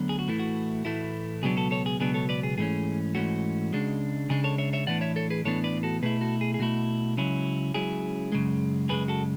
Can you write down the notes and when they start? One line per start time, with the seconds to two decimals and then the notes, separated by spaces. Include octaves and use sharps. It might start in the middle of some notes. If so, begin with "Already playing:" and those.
Already playing: D2 D3 F#3 B3
0.09 G#4
0.19 F#4
0.28 A2 E3 A3 E4
0.39 F#4
0.85 A2 E3 A3 E4
1.43 C#2 B2 F#3 B3 D4 G#4
1.57 F#4 A4
1.71 A4 C#5
1.86 G#4
2.00 C#2 B2 F#3 B3 D4 G#4
2.14 A4 C#5
2.29 B4 D5
2.43 G#4
2.58 G#2 E3 A3 C#4 G#4
3.15 G#2 E3 A3 C#4 F#4
3.73 C#2 C#3 G#3 D4
4.29 C#2 C#3 G#3 D4 G#4
4.44 A4 C#5
4.58 C#5 E5
4.73 C#5 E5
4.87 A2 E3 B3 D4 D5 F#5
5.01 C#5 E5
5.16 A4 C#5
5.30 G#4 B4
5.45 A2 E3 B3 D4 A4 C#5
5.64 B4 D5
5.83 F#4 A4
6.02 B2 A3 E4 G#4 B4
6.21 F#4 A4
6.41 G#4
6.54 G#4
6.59 B2 A3 E4 F#4
7.17 C#2 C#3 F#3 C#4 E4
7.74 C#2 C#3 F#3 C#4 E4 G#4
8.32 F#2 C#3 G#3
8.89 F#2 C#3 G#3 G#4 B4
9.08 F#4 A4